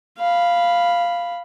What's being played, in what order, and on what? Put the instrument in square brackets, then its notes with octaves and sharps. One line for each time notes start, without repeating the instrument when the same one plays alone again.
[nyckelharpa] F5 B5